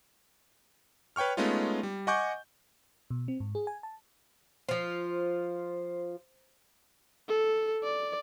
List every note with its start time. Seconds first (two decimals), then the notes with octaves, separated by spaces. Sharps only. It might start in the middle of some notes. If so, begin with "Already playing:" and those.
1.16 B4 C#5 G5 C#6 F6
1.37 G#3 A3 B3 C#4 D#4 F4
1.83 G3
2.07 D#5 F#5 G#5 C#6 D6 G6
3.10 B2
3.28 C4
3.40 G#2
3.55 G#4
3.67 G#5
3.83 A5
4.69 F3 F4 C5
7.29 A4
7.84 D5